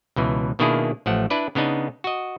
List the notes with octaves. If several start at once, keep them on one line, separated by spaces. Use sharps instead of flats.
C#2 B2 E3
B2 D#3 A#3 D4 E4 G#4
A1 F3 A3 F#5
D4 E4 B4 D5
C#3 B3 D4 D#4
F#4 D#5